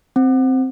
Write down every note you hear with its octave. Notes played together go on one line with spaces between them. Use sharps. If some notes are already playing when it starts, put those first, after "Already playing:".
C4